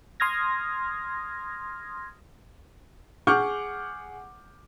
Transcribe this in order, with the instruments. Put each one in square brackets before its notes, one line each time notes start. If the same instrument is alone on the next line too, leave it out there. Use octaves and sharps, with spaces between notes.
[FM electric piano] C6 D#6 F6 G#6 A#6
[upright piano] G#4 F#5 C#6 D6 F6 G6